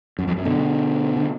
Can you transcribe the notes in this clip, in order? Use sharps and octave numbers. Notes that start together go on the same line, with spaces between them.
F#2
F2
F#2
B2 D3
D3